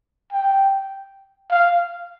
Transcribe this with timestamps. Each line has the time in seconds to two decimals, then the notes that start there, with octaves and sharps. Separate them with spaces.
0.33 G5
1.51 F5